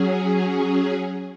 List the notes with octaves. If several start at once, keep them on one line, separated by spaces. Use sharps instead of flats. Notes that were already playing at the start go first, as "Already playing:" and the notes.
Already playing: F#3 C#4 G#4